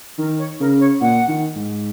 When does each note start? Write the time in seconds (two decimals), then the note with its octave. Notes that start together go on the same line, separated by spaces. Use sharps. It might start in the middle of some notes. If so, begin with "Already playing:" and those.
0.18 D#3 A#4
0.38 C#5
0.60 C#3 A#4
0.80 C#5
1.01 A#2 F#5
1.28 D#3
1.56 G#2